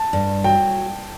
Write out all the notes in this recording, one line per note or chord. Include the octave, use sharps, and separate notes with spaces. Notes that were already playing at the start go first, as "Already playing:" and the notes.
Already playing: A5
G2
F#3 G5